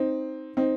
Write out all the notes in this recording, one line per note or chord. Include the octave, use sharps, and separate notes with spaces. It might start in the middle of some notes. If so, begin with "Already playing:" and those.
Already playing: C4 D#4
C4 D#4